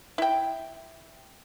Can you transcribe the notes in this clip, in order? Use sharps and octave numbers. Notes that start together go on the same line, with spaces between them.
E4 G5